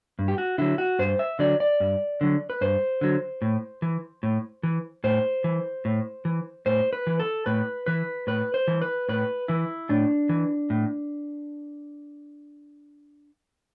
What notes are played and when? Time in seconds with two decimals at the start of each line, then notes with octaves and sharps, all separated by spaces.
0.19 G2
0.28 G4
0.38 F#4
0.58 D3 F#3 E4
0.78 F#4
0.99 G2 C5
1.19 E5
1.39 D3 F#3 D5
1.60 D5
1.80 G2
2.21 D3 F#3
2.50 B4
2.61 G2 C5
3.01 D3 F#3
3.42 A2
3.82 E3
4.23 A2
4.63 E3
5.04 A2 C5
5.44 E3
5.85 A2
6.25 E3
6.66 A2 C5
6.93 B4
7.07 E3
7.19 A4
7.46 A2 B4
7.86 E3 B4
8.27 A2 B4
8.54 C5
8.68 E3
8.82 B4
9.09 A2 B4
9.48 E3 E4
9.89 A2 D4
10.29 E3
10.70 A2